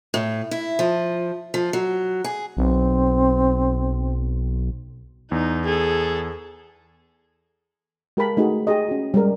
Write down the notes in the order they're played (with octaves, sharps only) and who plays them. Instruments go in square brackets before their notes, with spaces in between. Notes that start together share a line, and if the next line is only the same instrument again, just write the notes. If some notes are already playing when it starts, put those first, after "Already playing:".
[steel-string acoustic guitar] A2
E4
F3
F3
F#3
G#4
[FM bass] B1 [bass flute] C4
[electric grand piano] E2 [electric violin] D#4
[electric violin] G#4 A4
[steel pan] G#3 G4 A#4 F5 A5 B5
A3 D#4 F#4 G#4
G4 G#4 D#5
C#4 F#4
G3 G#3 A#4